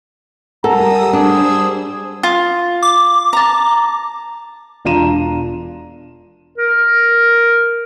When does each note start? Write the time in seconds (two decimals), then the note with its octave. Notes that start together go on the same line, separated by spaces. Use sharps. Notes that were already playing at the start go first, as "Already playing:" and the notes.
0.64 G3 A4 A#4 F#5 G#5 A#5 D#6 E6
1.13 G3 D4 G#4 C5 E6
2.23 F4
2.82 D6
3.33 A5 A#5
4.85 E1 D4 F4 A#5 D#7 E7
6.58 A#4